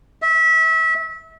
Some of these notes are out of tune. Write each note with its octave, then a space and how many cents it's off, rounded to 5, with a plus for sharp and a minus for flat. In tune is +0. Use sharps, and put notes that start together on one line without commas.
E5 -30